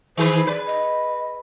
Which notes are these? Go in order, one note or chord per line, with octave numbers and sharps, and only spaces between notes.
D#3 G#4 B4 C5
B4 D5
D#5